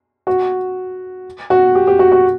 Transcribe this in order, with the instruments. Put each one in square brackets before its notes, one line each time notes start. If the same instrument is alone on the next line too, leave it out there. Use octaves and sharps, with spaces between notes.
[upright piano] F#4
F#4
G4
G4
F#4
F#4